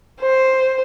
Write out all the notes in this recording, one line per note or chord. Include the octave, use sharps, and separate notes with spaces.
C5